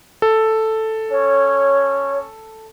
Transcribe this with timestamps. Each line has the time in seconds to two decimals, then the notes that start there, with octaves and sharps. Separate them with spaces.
0.22 A4
1.11 C#4 C#5